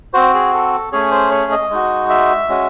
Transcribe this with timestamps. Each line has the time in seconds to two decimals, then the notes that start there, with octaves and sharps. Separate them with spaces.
0.13 C4 F#4 C5
0.34 G#4
0.54 A4
0.92 A3 C#4 G#4 C#5
1.11 C5
1.31 C#5
1.52 D#5
1.70 G#3 D#4 F#4
2.10 E5
2.49 G#3 C#4 F#4